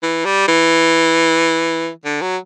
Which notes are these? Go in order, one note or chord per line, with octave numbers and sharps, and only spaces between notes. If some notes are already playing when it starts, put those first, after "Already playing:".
E3
G3
E3
D3
F#3